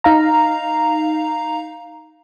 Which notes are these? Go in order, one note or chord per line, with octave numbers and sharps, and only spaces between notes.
D#4 F5 A#5